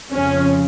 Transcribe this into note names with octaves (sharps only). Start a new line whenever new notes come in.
F2 C#3 F3 C#4